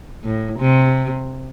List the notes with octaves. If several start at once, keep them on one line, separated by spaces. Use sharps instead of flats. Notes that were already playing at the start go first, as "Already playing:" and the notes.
A2
C3